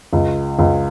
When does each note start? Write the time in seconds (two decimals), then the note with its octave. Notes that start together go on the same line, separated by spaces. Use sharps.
0.13 C#2
0.59 C#2